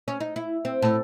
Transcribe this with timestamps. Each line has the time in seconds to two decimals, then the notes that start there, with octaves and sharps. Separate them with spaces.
0.08 C#4
0.20 D#4
0.36 E4
0.65 C4
0.82 A2